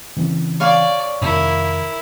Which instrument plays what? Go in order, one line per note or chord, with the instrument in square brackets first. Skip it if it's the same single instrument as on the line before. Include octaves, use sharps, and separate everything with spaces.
[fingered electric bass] C#3 E3 C4
[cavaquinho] C#5 F5 G#5 [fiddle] D5
[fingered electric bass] F2 C3 D#3 [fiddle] E4 A#4